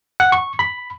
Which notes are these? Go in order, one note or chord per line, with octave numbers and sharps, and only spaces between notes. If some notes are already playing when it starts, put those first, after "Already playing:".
F#5
C#6
B5